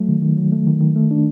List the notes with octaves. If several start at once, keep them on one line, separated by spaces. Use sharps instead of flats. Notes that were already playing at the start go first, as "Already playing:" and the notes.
Already playing: F#3 A3
D#3
D#3
F#3
A3
D#3
D#3
A3
D4